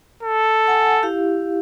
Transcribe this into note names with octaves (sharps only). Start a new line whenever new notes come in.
A4
F#5 G#5
E4 G4 F5